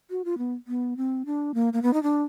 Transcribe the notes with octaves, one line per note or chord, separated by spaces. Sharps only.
F#4
F4
B3
B3
C4
D4
A#3
A#3
B3
D#4
D4